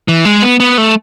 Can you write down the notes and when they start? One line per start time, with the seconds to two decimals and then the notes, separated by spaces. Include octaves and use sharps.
0.08 E3
0.25 G#3
0.42 B3
0.60 B3
0.78 A3